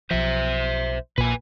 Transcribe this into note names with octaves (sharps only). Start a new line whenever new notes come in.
B1 F3 C5 E5
A#1 A#2 B4 G#5